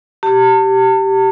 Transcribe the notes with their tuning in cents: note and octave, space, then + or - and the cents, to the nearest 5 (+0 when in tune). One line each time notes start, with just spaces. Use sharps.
G4 -15 A5 +40